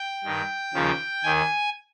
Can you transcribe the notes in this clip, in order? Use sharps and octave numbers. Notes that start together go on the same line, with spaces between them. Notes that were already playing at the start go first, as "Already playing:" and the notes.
Already playing: G5
G2 D#3
D#2 C#3 F3
D#2 D#3 G#5